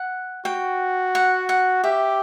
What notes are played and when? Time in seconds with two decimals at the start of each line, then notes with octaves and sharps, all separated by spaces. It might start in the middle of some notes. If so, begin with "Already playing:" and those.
Already playing: F#5
0.45 F#4 G5
1.15 F#5
1.49 F#5
1.84 G4 E5